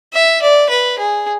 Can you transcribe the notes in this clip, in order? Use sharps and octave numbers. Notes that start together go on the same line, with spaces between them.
E5
D5
B4
G#4